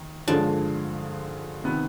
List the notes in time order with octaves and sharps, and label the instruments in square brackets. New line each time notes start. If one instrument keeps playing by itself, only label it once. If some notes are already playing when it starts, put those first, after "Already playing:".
Already playing: [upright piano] D#3
[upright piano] G2 D3 F3 G#3 [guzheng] D4
[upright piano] C3 D#3 B3